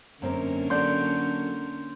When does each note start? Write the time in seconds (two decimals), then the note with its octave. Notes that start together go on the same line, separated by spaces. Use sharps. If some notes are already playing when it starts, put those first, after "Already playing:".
0.22 F#2 D3 A#3 C4 C#4 A#4
0.70 F#3 A4 D5 C6 G6